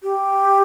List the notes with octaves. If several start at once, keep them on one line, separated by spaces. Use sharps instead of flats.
G4